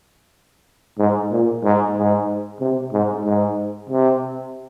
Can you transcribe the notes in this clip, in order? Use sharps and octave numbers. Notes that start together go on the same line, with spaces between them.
G#2
A#2
G#2
G#2
C3
G#2
G#2
C3